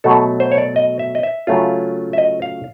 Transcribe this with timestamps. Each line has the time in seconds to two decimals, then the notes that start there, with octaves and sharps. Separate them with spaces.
0.04 B2 F#3 A3 A4
0.40 C5
0.52 C#5
0.58 D5
0.76 D#5
0.99 E5
1.15 D#5
1.23 E5
1.47 C#3 F#3 A3 C#4 F4
2.13 E5
2.18 D#5
2.42 F5